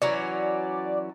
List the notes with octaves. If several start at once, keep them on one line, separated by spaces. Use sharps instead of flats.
E3 F#3 C#4 D5